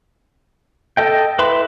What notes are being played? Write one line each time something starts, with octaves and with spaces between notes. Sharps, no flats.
A4 D#5 G5
E4 B4 B5 C6